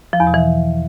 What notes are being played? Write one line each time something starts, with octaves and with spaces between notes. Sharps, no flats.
F3
E2
B2
E3